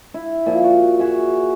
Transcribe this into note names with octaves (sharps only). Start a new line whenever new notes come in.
E4
A#2 F3
F#4 D5
F#4 G#4 E5